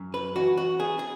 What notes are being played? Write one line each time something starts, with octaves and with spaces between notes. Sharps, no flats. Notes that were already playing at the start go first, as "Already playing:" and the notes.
Already playing: F#2
B4
E3 F#4
F#4
B3 G#4
G#4